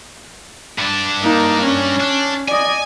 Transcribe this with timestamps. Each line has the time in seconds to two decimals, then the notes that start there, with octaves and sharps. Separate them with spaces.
0.79 G2 D4
1.22 A#3 D#4
1.63 C#4
2.00 D4
2.48 D5 D#5 G#5